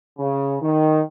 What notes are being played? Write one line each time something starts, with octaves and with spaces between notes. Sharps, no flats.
C#3
D#3